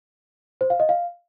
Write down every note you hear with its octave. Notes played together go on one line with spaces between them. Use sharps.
C5
F5
D#5
F5